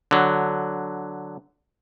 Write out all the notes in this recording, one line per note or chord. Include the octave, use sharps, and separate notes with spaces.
D3 F#3